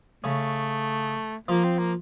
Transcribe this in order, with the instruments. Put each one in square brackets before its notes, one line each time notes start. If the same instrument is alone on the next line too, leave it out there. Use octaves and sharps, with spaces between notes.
[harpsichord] C#3 C#4 [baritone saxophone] A3
[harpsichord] F3 F4 [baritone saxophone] A#3
[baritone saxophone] C4
A#3